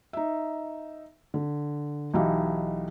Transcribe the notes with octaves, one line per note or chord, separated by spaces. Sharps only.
D#4 E5
D3
B1 E3 D#4 G4 E5 F5